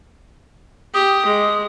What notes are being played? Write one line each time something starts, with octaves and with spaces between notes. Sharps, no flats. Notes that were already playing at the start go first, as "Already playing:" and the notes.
G4 D#6
G#3